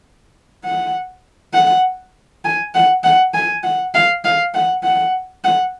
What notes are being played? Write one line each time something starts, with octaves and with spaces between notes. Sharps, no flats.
F#5
F#5
G#5
F#5
F#5
G#5
F#5
F5
F5
F#5
F#5
F#5